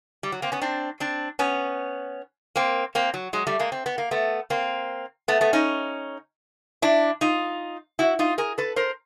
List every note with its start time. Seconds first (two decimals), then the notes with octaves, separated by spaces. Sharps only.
0.23 G3
0.32 F#3
0.42 A#3 C4
0.52 B3 C#4
0.61 C4 D4
1.00 C4 D4
1.39 B3 C#4
2.55 A#3 C4
2.95 A#3 C4
3.14 F#3
3.33 F#3 G#3
3.47 G3 A3
3.59 G#3 A#3
3.72 C4
3.86 B3
3.98 A#3
4.11 A3 B3
4.50 A#3 C4
5.28 A3 B3
5.41 A3 B3
5.53 C#4 D#4
6.82 D4 E4
7.21 D#4 F4
7.99 E4 F#4
8.19 D#4 F4
8.38 G#4 A#4
8.58 A4 B4
8.76 A#4 C5